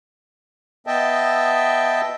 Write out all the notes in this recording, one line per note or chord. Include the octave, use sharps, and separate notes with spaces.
B3 D#5 E5 G5 A5